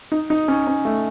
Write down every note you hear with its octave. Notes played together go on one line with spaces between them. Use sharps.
D#4
D#4
C#4
C#4
A3